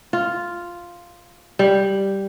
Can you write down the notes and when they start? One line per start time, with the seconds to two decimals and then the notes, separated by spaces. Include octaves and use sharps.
0.13 F4
1.59 G3